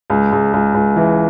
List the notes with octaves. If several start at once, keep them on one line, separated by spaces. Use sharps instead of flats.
C#2
C#2
C#2
C#2
E3